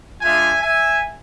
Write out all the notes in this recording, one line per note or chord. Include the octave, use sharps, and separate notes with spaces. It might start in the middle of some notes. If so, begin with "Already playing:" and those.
G#3 D4 F4 E5 G#5
E5 G#5